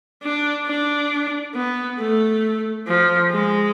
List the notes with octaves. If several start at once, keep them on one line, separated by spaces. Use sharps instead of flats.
D4
D4
B3
A3
F3
G#3